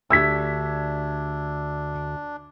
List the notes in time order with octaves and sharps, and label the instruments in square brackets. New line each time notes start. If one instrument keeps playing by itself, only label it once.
[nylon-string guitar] D2 G4 [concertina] D4 [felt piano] E6 G#6 B6